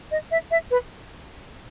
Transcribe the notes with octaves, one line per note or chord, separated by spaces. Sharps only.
D#5
E5
E5
B4